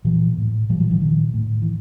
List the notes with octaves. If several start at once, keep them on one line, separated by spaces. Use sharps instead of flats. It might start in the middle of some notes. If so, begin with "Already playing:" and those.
A#2 E3 F#3
A2
A#2 F3 G3
E3 F#3
D#3 F3
A#2 D#3
A2
E3